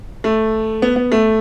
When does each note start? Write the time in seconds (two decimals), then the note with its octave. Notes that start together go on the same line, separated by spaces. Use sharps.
0.24 A3
0.82 B3
0.96 B3
1.12 A3